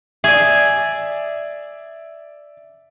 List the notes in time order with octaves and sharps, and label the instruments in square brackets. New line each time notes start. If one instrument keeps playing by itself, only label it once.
[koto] G#4 [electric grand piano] D5 E5